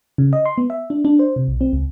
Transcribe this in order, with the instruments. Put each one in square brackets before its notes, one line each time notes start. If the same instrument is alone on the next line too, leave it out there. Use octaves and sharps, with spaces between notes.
[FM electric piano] C#3
D#5
C6
B3
E5
D4
D4
C5
C3
B1
C4
C#2